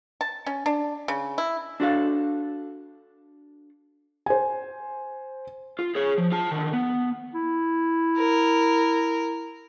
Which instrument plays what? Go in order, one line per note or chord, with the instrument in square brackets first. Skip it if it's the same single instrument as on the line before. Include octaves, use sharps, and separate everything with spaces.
[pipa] A5
C#4
D4
C#3
E4
[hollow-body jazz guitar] D4 F#4 A4 F5
[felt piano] C5 G#5
[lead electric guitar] F4
G#4 C#5
F3
F4 A5
D3 D#3
B3
[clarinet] E4
[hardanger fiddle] A#4